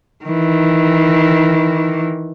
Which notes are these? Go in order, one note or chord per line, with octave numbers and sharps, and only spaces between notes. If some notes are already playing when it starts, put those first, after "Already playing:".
D#3 E3